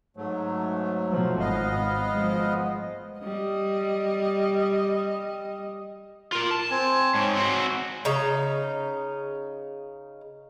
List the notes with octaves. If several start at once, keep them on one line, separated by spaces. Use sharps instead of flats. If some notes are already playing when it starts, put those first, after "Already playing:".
G#2 F#3 A3
B2 F3
G#1 B3 D#5 F5
F3 G#3
G3 D#5
F4 A#4
A5
C4 G#5
G#2 C#5 G#5
C4 F#4
C#3 D#4